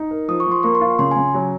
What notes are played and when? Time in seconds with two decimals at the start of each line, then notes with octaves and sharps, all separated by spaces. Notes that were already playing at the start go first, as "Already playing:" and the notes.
Already playing: D#4
0.11 A#4
0.28 F3 D#6
0.40 C#6
0.46 F3
0.52 C6
0.63 A#3 C#6
0.75 C6
0.81 F4
0.99 C#3 C6
1.11 G#5
1.16 C#3
1.34 F#3